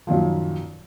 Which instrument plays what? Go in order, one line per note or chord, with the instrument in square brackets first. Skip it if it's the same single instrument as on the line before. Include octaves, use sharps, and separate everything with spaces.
[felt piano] F#2 A#2 D#3 F3